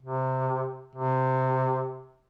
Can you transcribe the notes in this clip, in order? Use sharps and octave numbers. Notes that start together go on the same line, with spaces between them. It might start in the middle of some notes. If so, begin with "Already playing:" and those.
C3
C3